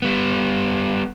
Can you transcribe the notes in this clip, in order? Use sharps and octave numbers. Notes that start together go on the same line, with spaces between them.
G3 B3